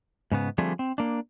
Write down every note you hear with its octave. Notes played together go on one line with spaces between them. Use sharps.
G#2 C#3 B3
D3 F3 G3 A3 C4 G#4
C4
A#3 D4